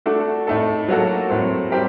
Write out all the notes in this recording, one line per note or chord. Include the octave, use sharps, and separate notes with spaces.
A3 D4 F#4 A4
A2 A3 D#4 A4
F#3 A#3 F#4 A4
A2 F#3 C4
G3 C4 G4 A#4